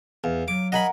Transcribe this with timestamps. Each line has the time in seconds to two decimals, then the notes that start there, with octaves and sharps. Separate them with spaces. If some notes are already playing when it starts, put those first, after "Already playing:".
0.24 E2 F5
0.48 F#3 D6
0.72 A#4 D#5 F#5 G#5 B5